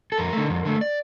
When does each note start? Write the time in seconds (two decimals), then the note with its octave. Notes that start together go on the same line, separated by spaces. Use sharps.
0.12 A4
0.18 F2 A#4
0.33 D3 A3
0.50 F2
0.65 D3 A3
0.81 D5